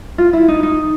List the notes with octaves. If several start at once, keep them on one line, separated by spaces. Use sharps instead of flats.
F4
E4
D#4
D#4